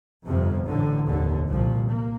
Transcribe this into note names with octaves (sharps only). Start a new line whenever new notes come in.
G1 F2 C3 F3
A1 A2 D3
F1 D#2 D3
C2 A#2 F3
A#3